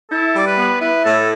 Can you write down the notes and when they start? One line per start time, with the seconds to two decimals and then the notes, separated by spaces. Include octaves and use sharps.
0.12 E4 A4
0.35 G3 D5
0.47 B4
0.58 B3
0.81 E4 B4
1.04 A2 A4